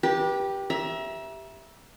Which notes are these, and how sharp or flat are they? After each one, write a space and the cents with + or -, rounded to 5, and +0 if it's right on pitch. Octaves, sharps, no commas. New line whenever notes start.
G4 +0 B4 -35
E5 +0 A#5 +35